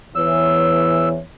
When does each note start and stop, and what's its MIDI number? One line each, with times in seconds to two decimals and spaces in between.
0.15 1.19 40
0.15 1.19 52
0.15 1.19 73
0.15 1.09 88